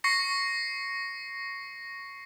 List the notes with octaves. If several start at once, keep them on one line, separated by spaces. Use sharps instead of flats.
C#6 A#6 C7 C#7